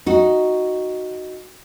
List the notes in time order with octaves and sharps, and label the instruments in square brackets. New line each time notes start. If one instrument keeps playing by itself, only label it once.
[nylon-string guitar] D#4 F#4